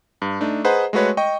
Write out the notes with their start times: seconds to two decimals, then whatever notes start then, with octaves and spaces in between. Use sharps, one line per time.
0.22 G2
0.41 A3 D4 D#4
0.64 G#4 B4 C5 D#5 F#5 A#5
0.93 G#3 A3 F#4 B4 C#5
1.17 D#5 G5 C#6